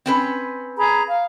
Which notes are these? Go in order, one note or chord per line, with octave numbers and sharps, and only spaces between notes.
C4 C#4 B4
G#4 A#5 B5
F5